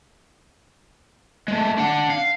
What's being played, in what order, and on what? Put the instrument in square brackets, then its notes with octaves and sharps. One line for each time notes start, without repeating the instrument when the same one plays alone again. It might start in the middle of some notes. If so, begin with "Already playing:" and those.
[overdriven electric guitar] G#3 A3
D4 F#5
F5